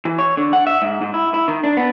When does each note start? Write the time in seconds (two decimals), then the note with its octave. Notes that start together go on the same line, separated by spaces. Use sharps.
0.05 E3
0.18 C#5
0.37 D3
0.53 F#5
0.67 E5
0.82 G#2
1.01 G#2
1.14 E4
1.34 E4
1.48 D#3
1.64 D4
1.77 B3